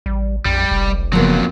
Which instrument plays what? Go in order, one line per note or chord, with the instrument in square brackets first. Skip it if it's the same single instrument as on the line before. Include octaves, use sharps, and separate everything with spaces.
[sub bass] A1 [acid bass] G3
[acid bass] A#1 [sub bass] F2 [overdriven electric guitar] G3
[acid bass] F1 [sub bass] B1
[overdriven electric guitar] F2 F#3 [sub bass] C#3 [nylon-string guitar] F3 A#3 B3